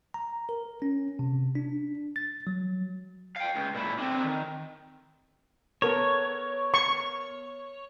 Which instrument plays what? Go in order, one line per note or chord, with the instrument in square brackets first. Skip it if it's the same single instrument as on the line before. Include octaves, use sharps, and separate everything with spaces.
[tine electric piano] A#5
A#4
C#4
C3
D4
A6
F#3
[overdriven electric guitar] F5 G5
C#2
A#2 E4
D3 C4
D#3
[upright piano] B3 A4 A#4 [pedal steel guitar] C#5
[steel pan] C#6